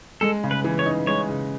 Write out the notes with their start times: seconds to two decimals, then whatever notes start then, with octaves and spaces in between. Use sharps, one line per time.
0.21 G#3 A4
0.44 C#3
0.51 B4
0.64 E3
0.79 C#5
0.86 D#4
1.07 G#3 C#5
1.29 C#3